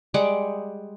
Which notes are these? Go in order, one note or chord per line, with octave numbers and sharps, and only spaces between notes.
G3 G#3 F#5 D6